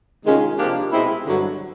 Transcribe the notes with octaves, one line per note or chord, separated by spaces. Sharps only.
C3 D#3 G#3 C#4 F4
C3 F3 A#3 D4 G4
B2 G#3 C4 E4
G2 D3 F#3